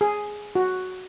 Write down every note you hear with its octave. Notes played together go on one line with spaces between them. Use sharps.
G#4
F#4